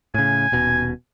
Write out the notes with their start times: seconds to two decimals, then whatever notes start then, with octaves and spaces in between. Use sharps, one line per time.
0.14 A2 C#3 G#5
0.52 D#1 B2